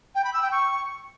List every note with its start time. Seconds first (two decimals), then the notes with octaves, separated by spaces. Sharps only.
0.15 G5
0.24 B5
0.33 E6
0.42 G5
0.52 C#6